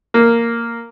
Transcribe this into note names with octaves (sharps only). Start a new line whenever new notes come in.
A#3